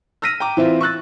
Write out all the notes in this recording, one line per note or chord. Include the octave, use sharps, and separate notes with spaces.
E6 F6 A#6 B6 D#7
G5 A#5 D6
E3 C4 E4 F4
C#6 E6 F#6 A6